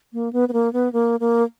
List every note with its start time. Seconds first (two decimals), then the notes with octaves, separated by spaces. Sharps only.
0.13 A#3
0.33 B3
0.49 B3
0.53 A#3
0.73 B3
0.93 A#3
1.20 A#3